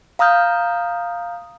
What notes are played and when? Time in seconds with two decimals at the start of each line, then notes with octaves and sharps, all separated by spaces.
0.19 F5 A#5 D#6 F6 G6